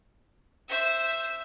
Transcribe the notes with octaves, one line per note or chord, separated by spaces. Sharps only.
C5 E5